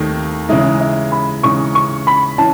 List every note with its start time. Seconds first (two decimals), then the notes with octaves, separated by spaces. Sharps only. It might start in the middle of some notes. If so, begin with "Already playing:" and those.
Already playing: D#2 D#3 A3 D#4
0.49 C#3 E3 G#3 D#4 E5
0.80 E5
1.12 B5
1.43 C#3 E3 G#3 D#4 C#6
1.75 C#6
2.07 B5
2.38 E3 C#4 E4 A5